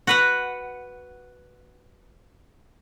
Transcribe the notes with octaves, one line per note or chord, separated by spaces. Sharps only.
F#4 B4 F#5